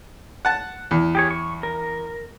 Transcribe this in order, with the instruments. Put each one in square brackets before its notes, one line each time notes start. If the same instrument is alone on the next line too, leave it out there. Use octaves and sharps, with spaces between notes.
[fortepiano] F#5 A5
E2
[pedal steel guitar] G4 G#4 C#5
C#6
A#4